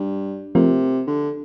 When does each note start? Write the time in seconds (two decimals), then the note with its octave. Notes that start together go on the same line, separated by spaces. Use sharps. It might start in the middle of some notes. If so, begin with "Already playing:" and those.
Already playing: G2
0.55 C3 F3 A3 C4 F4 A#4
1.07 D3